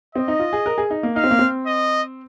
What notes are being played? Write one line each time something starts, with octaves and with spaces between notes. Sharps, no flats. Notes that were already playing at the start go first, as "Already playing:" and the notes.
C4 D#5
D#4
F4
G#4
A#4
G#4
D#4
A#3
D#4 F5
C4
A#3
C4
D#5